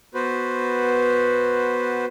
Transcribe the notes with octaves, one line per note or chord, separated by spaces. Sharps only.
B3 F#4 B4 C5